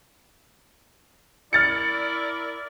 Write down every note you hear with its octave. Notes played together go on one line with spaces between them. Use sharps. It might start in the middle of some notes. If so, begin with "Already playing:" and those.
E4 A#4 D5 F6 A6 C#7